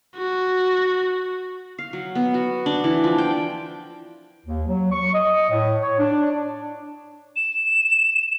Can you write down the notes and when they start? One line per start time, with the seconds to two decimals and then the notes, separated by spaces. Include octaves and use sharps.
0.17 F#4
1.79 F5
1.93 F#3
2.15 B3
2.34 F#4
2.66 D4
2.84 E3
3.04 F3
3.18 G5
4.46 D#2
4.67 F#3
4.92 C#6
5.14 D#5
5.50 A2
5.82 C#5
5.99 D4
7.36 E7